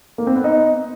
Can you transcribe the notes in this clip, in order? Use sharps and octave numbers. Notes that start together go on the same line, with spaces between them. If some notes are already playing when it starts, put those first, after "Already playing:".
A#3
C4
B3
D#4